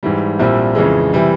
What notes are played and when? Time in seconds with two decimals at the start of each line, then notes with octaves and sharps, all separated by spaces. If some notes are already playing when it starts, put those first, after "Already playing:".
0.03 G#2 E3 G3
0.39 A#1 A#2 G3 C4 E4
0.75 F2 C#3 E3 G#3
1.13 C3 E3 G3